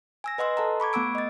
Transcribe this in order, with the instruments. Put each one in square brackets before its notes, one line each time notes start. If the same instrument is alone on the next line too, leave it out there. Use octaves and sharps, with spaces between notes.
[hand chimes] G#5 E6 A#6
B4 D#5 F#5 C6 E6
A4 F#5 A5 A#5
B5 C#6 D6 G#6
A3 B3 F#5 D6 E6 D7
D#5 A6